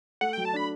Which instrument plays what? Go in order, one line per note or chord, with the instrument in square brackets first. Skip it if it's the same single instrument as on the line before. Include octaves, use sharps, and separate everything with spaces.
[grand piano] A3 [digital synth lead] F#5
[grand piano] F#3 [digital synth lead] G5
[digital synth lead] A5
[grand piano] D4 [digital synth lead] B5